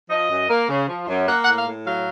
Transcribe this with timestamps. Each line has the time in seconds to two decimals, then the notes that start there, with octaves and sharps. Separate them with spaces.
0.09 F3 D#5
0.29 F#2
0.49 A#3
0.69 C#3
0.87 F3
1.08 F#2
1.27 A#3 F#5
1.44 F#5
1.47 A2
1.56 F5
1.66 A2
1.86 F#3 F5